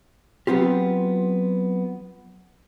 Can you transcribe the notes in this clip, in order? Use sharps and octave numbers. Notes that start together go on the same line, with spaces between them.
F#3 B3 C4 F4 G4